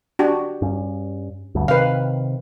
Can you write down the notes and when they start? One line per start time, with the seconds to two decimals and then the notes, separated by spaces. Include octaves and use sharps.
0.19 D4 F#4 G4
0.62 G2 C#4
1.55 D2 G2
1.68 C3 D#3 B4 F5